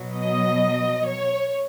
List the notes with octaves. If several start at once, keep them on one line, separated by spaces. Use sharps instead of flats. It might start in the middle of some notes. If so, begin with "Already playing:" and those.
Already playing: B2 F#3
D#5
C#5